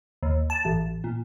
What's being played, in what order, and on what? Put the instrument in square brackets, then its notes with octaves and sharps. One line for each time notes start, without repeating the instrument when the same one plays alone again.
[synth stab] D#2
A5
A1
A#2